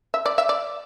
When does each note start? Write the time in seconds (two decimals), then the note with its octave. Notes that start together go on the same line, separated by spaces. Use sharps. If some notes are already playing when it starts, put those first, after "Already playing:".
0.14 E5
0.26 D5
0.38 E5
0.49 D5